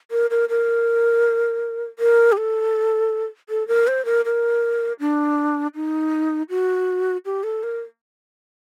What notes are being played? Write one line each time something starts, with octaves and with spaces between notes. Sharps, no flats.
A#4
A#4
A#4
A#4
G4
A4
A4
A#4
C5
A#4
A#4
D4
D#4
F#4
G4
A4
A#4